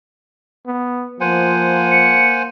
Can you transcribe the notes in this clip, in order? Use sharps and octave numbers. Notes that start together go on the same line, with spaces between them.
B3
F3 A#3 C5 F#5 G#5
C#7